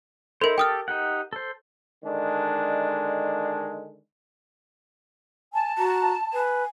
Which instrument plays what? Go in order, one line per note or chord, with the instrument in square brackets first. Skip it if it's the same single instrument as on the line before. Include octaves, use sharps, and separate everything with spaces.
[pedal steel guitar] D#4 E4 C5 [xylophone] A4 A#4
[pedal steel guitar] G4 A4 A5 [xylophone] G5 D#6 F6
[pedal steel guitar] D#4 G4 F#5
A4 C5
[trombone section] D3 D#3 G#3 D4
[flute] G#5 [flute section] A5
[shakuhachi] F#4 [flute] A#5
[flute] B4 [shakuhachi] G#5